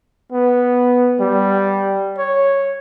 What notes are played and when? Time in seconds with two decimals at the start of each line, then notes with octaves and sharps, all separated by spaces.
0.32 B3
1.20 G3
2.18 C#5